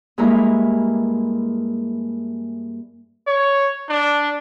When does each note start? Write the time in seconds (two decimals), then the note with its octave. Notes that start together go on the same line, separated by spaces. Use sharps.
0.18 G2 G#3 A#3 E4 A#5
3.27 C#5
3.90 D4